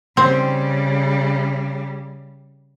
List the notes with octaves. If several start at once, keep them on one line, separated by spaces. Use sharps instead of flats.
C#3 G3 C4